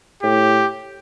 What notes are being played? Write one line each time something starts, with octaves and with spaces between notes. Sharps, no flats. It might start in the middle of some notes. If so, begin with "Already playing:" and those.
A2 G4